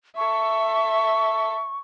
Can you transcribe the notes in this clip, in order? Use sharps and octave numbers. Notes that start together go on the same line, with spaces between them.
A4 E5 C#6